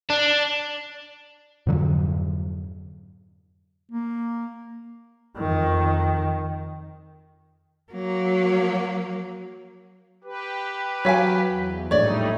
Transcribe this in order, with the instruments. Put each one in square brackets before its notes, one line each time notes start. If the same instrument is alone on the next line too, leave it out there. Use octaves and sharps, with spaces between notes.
[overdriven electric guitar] D4
[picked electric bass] F2 G#2 D3 F#3
[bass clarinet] A#3
[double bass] F2 D#3
[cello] F#3 A#3
[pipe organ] G4 B4
[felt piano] F#3 B6 [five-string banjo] C#5 F5 G#5
[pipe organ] E2
[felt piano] A#1 A2 [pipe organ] G3 A3 D#4 [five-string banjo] C#5 D5